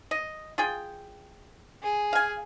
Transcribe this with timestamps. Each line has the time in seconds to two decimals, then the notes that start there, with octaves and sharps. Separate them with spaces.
0.11 D#5
0.58 F4 G#4 G5
1.82 G#4
2.13 F5 G#5